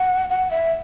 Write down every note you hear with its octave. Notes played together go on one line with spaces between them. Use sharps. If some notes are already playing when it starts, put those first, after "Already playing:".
Already playing: F#5
F#5
E5